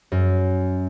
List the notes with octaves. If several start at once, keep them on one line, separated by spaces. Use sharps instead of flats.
F#2